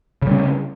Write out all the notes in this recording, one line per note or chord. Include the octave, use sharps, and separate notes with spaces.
C#3 G3 C#4